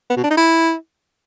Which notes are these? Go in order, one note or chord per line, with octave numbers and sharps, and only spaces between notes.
B3
B2
D4
D#4
E4